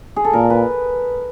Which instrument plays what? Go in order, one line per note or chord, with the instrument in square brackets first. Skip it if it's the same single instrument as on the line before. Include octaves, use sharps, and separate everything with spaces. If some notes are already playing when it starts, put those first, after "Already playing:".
[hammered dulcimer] G#4
A4
[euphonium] A#2 [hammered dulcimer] A#4
[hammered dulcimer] B4